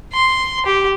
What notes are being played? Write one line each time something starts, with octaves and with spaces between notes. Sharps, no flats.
C6
G4